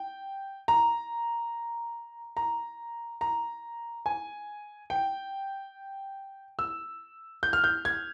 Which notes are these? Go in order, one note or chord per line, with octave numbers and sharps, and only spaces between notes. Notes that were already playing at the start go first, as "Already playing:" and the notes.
Already playing: G5
A#5
A#5
A#5
G#5
G5
E6
G6
F6
G6
G#6